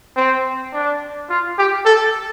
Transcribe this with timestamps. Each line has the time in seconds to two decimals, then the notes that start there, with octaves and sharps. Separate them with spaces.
0.16 C4
0.73 D4
1.30 F4
1.58 G4
1.86 A4